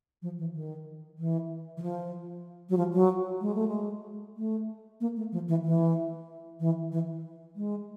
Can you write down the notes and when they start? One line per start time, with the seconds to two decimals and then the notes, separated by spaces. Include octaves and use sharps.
0.22 F3
0.38 E3
0.54 D#3
1.18 E3
1.77 E3
1.82 F3
2.69 F#3
2.77 F3
2.93 F#3
3.41 G#3
3.55 A3
3.68 G#3
4.37 A3
5.01 A#3
5.16 A3
5.32 F3
5.48 E3
5.64 E3
6.60 E3
6.92 E3
7.56 G#3